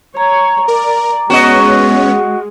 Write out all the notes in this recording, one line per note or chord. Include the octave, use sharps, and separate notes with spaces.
C#5 A#5
A#4 D5
G#3 B3 C#4 F#4 C#5 D#5